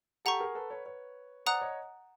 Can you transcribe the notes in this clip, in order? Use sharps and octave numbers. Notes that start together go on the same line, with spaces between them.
G4 A4 F#5 A#5 C#6
G#4 A#4
A4 B4
B4 C#5
B4 C#5
C5 D5 F#5 A#5 D#6 F#6
C#5 D#5